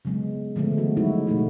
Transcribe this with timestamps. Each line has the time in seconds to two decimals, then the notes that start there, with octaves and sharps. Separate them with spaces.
0.05 C#3 F#3 G#3 B3
0.56 D3 F3 G#3 A3 B3
0.78 E3 F#3 F#4
0.97 F#3 G#3 A3 D#4 E4 F#4
1.27 B2 F3 G3 A3 D#4 F#4